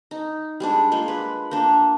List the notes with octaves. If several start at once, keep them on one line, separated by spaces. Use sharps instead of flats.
D#4
G3 G#3 D4
G#3 A#3 F4
B4
A#3 D4